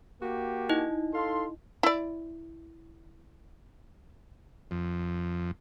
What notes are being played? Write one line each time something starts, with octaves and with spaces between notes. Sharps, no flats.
A#3 F#4 G4
D#4 E4 D#5
A4 F5 C6
E4 D5
F2